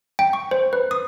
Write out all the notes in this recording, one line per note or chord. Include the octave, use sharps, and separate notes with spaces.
G5
C#6
C5
B4
D#6